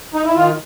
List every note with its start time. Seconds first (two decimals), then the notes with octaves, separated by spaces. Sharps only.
0.14 D#4
0.25 E4
0.36 D#3 F4